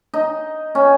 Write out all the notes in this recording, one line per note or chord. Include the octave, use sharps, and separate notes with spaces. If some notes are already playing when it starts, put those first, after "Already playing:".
D#4
C#4